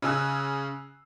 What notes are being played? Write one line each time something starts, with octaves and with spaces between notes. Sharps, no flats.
C#3 G#5 E6 F#6